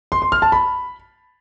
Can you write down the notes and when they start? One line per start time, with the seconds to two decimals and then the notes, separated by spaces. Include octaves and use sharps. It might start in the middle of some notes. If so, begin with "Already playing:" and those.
0.12 C6
0.22 C6
0.32 F6
0.42 A5
0.52 B5